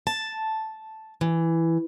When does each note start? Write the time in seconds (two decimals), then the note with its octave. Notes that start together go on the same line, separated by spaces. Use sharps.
0.07 A5
1.21 E3